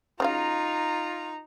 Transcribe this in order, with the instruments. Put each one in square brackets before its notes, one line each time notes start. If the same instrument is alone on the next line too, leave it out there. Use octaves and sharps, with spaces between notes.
[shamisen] C#3 F#3 F5 [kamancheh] D#4 A#5 [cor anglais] F4